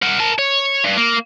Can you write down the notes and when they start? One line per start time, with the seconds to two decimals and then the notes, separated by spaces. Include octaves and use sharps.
0.03 A#4 F#5
0.20 A#4 A5
0.39 C#5
0.85 G2
0.97 A#3